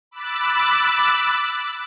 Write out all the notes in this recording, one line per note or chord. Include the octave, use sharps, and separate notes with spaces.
B5 D6 E6 F#6 A6